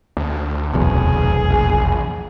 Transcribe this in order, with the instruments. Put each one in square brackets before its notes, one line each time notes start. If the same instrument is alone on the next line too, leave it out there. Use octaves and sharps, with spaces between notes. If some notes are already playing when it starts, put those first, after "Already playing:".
[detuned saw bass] D2
[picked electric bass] F1 B1 E2 [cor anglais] G#4
[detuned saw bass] A#1